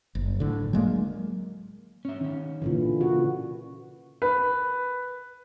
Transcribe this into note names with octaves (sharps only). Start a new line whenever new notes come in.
F#1
A2 D3
F#3 G#3 A#3
C#4 E5
D#3 C#4
A#2 D3 E3
C#3 F#4
B4